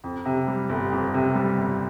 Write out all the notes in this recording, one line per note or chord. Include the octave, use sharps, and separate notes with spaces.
F2
C3
G3
G1
F2
C3
G3
G1